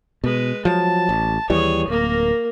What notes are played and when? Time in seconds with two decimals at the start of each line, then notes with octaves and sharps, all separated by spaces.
0.24 B2 G#3 B4
0.65 F3 F#3 A5
1.09 A1
1.50 D#2 E3 G3 G#4 C#5
1.88 D1 A#3 A#4